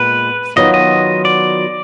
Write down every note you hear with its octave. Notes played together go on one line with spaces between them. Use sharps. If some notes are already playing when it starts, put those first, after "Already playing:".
Already playing: A#2 G#3 B3 B4
D#3 F#3 B3 F4 D#5
D#5
D5